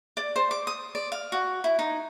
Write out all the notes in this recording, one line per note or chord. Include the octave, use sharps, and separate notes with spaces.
D5
C5
D6
D#6
D5
F5
F#4
E4
D#4